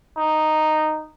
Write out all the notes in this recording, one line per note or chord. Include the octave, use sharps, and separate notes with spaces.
D#4